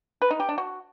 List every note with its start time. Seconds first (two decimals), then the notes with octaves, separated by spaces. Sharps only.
0.22 B4
0.31 D#4
0.40 G4
0.49 D4
0.58 F#4